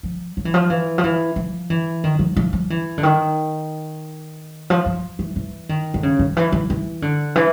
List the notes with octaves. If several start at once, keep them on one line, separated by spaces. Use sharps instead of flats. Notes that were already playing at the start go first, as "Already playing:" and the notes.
F3
F3
E3
F3
E3
F3
E3
F3
E3
D#3
F3
F3
F3
E3
D3
D#3
F3
F3
E3
E3
D#3
D3
C#3
D#3
E3
E3
E3
D3
E3